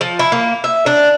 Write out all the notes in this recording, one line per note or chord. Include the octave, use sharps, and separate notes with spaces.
F3
E4
A#3
E5
D4